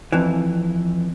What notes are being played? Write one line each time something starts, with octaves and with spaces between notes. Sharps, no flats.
F2 E3